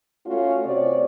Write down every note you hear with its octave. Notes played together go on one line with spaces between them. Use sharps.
A3 C#4 F4 F#4
C3 C#5 D5